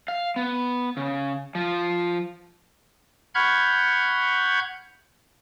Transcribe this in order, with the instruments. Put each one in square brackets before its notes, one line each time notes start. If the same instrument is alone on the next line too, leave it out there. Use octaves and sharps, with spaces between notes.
[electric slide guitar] F5
B3
C#3
F3
[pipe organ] F#5 B5 C#6 F6 G6 G#6